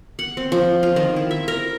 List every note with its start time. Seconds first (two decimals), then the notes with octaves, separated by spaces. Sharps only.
0.19 F#5
0.37 C4
0.52 F3
0.83 F4
0.96 D#3
1.16 E4
1.31 E5
1.48 A#4